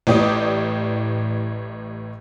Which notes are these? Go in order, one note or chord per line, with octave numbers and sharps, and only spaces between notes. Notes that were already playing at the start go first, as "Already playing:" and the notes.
A1 A2 G4 D5 D#6